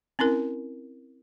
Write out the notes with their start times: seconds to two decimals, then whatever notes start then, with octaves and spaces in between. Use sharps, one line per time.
0.19 C4 C#4 E4 A#4